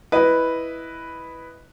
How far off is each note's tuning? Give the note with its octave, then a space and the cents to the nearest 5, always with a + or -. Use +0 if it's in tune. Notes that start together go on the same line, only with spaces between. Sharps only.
E4 +0 B4 +0 D#5 +0